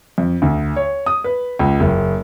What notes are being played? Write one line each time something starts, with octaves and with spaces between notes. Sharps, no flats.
F2
D2
C#5
D#6
B4
C#2
F#1